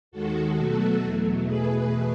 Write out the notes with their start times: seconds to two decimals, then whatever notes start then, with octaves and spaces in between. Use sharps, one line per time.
0.11 D#2 D#3 G#3 F#4 A4
0.57 B2 F#3 A3
1.01 E2 B2 F#3 A3
1.46 E2 B2 A3 G#4 B4